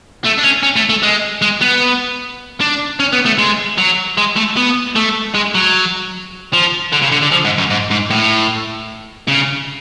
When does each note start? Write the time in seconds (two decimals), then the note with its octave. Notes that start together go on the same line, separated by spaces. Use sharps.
0.24 A3
0.38 D4
0.43 C#4
0.63 C#4
0.76 A3
0.89 A3
1.03 G#3
1.42 G#3
1.62 B3
2.61 D4
3.00 C#4
3.13 B3
3.26 A3
3.39 G#3
3.78 F#3
4.17 G#3
4.36 A3
4.57 B3
4.96 A3
5.35 G#3
5.55 F#3
6.53 F3
6.92 D3
7.02 C#3
7.11 D3
7.22 D3
7.32 F3
7.45 G#2
7.58 F#2
7.70 G#2
7.91 G#2
8.10 A2
9.28 C#3